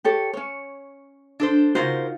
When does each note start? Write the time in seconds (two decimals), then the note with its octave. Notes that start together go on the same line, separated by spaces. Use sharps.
0.05 G4 A4 C#5
0.33 C#4 C#5
1.40 D4 A4 C5
1.75 C#3 D#4 F4 F#4 A#4 C5